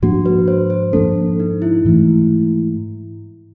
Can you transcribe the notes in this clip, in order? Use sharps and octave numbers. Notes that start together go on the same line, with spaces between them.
G#2 F3 A#3 D4 F#4
B4
C5
C5
G#2 F3 A#3 D4 A4
D#4
E4
G#2 E3 A3